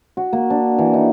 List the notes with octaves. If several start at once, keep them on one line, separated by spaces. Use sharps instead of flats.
F#4
A#3
D4
E3
D#4